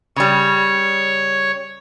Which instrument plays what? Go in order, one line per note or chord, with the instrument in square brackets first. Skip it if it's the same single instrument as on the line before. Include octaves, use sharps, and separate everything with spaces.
[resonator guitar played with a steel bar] C#3 G3 [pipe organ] C#5